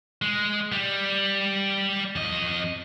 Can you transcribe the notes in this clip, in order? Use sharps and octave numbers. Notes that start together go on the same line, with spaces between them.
G#3
G3
F2 D#5